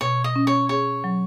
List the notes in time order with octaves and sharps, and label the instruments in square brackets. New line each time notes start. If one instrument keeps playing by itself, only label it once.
[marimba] B2 [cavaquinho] C#5
[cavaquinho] D#5
[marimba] C#4
[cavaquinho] C#5
[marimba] G#4 [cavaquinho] C#5
[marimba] F#3